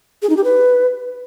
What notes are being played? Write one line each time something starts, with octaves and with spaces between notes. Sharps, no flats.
G#4
D#4
G4
B4